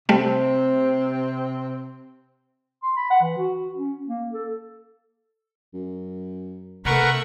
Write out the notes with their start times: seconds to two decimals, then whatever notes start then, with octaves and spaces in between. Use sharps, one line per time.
0.09 C3 G3 A3 C4
2.83 C6
2.97 B5
3.11 F#5
3.22 E3
3.38 F#4
3.76 C#4
4.07 A#3
4.33 A4
5.74 F#2
6.85 C3 A3 A#4 B4 F#5 C#6